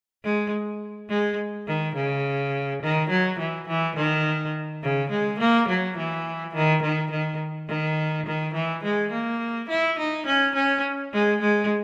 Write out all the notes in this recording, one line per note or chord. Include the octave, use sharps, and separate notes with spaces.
G#3
G#3
D#3
C#3
D#3
F#3
E3
E3
D#3
C#3
G#3
A#3
F#3
E3
D#3
D#3
D#3
D#3
D#3
E3
G#3
A#3
E4
D#4
C#4
C#4
G#3
G#3